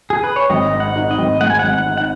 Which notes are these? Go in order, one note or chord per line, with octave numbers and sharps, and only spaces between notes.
G#4
B4
C#5
G#1 D#5
G#2
F#5
D#4
D#5
G#1
G#3 F#5
G#5
F#5
G#1
F#5
D#4
F#5